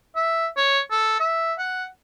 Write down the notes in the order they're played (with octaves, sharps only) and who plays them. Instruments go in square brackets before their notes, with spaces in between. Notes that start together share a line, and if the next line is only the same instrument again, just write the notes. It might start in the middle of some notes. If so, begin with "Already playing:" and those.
[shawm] E5
C#5
A4
E5
F#5